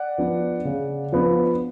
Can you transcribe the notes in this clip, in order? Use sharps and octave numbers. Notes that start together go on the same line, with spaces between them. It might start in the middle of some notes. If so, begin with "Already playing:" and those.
Already playing: D5 F#5
F3 B3 D4
C#3
F3 B3 D4